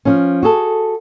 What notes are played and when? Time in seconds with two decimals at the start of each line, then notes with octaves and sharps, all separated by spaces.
0.05 F3 C#4
0.43 F#4 G#4 A4